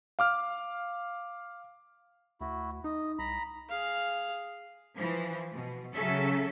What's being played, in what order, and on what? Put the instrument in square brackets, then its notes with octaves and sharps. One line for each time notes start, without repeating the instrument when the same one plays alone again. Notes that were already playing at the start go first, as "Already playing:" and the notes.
[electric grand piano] F5 D6 F6
[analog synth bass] D2 [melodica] E4 F#4
[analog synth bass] D#4 [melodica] D#5
[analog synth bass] C2 [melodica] A#5 B5
[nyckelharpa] G#4 F5
[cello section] E3 F3
B2
C#3 F#3 C#4 A4 E5